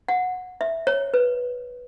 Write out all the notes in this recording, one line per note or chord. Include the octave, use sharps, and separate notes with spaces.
F#5
E5
C#5
B4